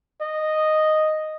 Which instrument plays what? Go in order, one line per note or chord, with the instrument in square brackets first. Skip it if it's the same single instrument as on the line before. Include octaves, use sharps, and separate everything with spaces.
[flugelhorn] D#5